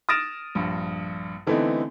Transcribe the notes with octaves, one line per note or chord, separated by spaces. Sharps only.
D#6 F6 A6 A#6 D7 E7
A#1 G2
D3 E3 A3 B3 C4 D#4